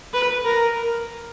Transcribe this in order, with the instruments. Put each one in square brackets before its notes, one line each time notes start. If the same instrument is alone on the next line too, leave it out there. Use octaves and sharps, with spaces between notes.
[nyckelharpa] B4
A#4